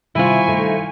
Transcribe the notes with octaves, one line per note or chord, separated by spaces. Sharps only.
C3 D#3 G3 E4 F4 C5 G#5 C#6
A3 D#4